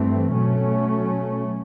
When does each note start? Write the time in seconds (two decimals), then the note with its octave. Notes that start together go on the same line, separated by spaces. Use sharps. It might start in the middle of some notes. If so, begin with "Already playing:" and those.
Already playing: G2 E3 A3 C4
0.33 B2 F#3 A3 C#4